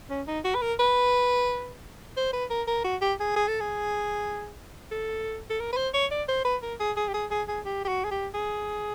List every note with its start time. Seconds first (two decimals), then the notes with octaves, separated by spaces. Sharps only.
0.10 C#4
0.27 D#4
0.44 F#4
0.55 B4
0.62 A#4
0.79 B4
2.17 C5
2.33 B4
2.50 A#4
2.67 A#4
2.84 F#4
3.01 G4
3.20 G#4
3.36 G#4
3.48 A4
3.60 G#4
4.91 A4
5.50 A4
5.60 A#4
5.72 B4
5.77 C5
5.94 C#5
6.11 D5
6.28 C5
6.45 B4
6.62 A#4
6.80 G#4
6.97 G#4
7.08 G4
7.14 G#4
7.31 G#4
7.48 G#4
7.65 G4
7.85 G4
7.88 F#4
8.04 G#4
8.11 G4
8.34 G#4